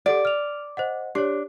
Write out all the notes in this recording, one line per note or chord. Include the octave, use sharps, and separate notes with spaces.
G4 A4 D5 F#5
F6 F7
C5 D#5 F#5
D4 G4 C#5